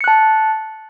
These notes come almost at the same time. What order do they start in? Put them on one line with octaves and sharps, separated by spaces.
C#7 F#6 A5